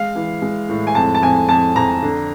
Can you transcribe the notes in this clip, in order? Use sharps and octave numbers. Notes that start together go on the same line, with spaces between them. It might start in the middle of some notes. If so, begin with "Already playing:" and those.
Already playing: G#3 F5
E3
G#3
A2
G#5
F2 A5
A5
F2 G#5
F2 A5
F2 A#5
D3